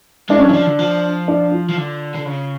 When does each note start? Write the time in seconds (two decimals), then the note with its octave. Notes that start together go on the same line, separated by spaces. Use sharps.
0.29 G#3 D4
0.39 F#3 C#4
0.49 F3 F#3 D4
0.66 D3
0.79 F3
1.28 D4
1.52 F4
1.69 F3
1.77 D3
2.15 D3
2.26 C#3